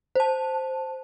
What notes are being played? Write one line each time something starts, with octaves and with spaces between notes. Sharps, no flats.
C5 A5